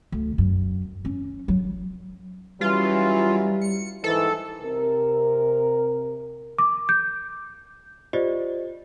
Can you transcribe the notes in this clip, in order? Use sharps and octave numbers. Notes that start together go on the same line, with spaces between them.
D2
F#2
C#4
F#3
E3 F#3 G3 C#4 F4
C#7
G#2 D#3 E3 A4
C3 A#4
D6
G6
F4 G4 C5 D5 D#5